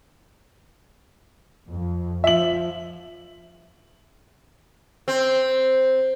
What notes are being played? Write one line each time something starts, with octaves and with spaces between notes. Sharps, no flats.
F2
F3 E5 F#7
C4